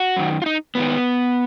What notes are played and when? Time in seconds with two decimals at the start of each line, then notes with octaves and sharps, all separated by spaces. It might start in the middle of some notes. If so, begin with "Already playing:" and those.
Already playing: F#4
0.17 F#2 D#3
0.42 F4
0.46 D#4
0.75 G#2 D#3 B3